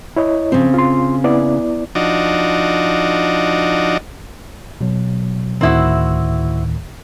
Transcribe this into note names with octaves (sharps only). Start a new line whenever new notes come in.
E4 C#5 D#5
C#3 F3 C4
F4 C6
B3 E4 D5
F3 D4 D#4 F#4 D5 D#5
B2 F#3
D2 A2 D#3 C4 E4 F#4